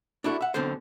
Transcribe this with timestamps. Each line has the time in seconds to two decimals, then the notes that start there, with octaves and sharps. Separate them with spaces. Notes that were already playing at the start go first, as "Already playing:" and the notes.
0.24 D4 E4 F#4 A4
0.41 E5 F#5
0.54 B1 B2 D3 C4 A4 C5